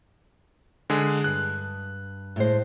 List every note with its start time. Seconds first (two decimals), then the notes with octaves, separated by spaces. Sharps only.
0.90 D3 G#3 G#4
1.24 G2 F#6
2.36 A2 G#3 C5